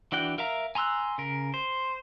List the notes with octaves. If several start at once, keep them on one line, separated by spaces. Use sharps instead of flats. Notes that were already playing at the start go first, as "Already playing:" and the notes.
E3 D4 F#4 G5 F#6
A#4 E5 F5 A#5
G#5 A#5 C6 E6 F#6
C#3 A#4
C5